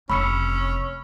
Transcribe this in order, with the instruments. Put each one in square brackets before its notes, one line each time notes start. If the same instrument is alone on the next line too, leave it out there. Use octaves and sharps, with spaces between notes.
[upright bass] F1 [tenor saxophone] C#4 [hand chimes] B5 E6 C#7